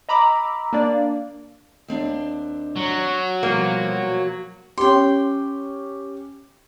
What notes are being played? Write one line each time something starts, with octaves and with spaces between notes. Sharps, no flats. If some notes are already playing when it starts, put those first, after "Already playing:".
D#5 A#5 B5 D6 E6
A#3 D4 D5
D#2 C4 D4
F#3
B2 F3 G3 A#3 F#4
C#4 G4 G5 C6